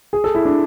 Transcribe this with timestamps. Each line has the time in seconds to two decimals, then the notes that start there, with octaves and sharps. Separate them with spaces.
0.13 G#4
0.24 A4
0.35 E4
0.45 D4